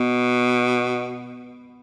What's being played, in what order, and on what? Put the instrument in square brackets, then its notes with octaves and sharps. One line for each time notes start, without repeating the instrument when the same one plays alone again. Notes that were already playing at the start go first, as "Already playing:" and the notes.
Already playing: [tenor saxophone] B2 [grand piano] B3